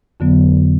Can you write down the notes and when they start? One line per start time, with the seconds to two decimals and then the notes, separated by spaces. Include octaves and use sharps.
0.20 F2 D3 F#3 B3